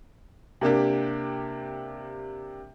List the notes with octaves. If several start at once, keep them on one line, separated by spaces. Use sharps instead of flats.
C3 A#3 D4 G4